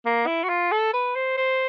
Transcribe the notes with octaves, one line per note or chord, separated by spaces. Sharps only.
A#3
E4
F#4
F4
A4
B4
C5
C5